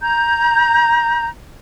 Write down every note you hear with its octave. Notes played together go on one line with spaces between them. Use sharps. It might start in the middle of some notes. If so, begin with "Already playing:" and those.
A#5 G6